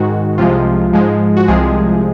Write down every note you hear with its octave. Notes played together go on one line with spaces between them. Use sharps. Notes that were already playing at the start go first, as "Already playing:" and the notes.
Already playing: G#2 D#3 G#3 F#4
C2 C3 F3 G#3 F4
G#2 F3 G#3
F#4
C2 C3 F3 G#3 G#4